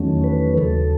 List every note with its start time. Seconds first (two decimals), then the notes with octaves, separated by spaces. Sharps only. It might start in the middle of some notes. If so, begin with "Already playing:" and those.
Already playing: E2 D#3 F#3 A3 C#4
0.24 B4
0.57 D#2 C#3 F#3 A4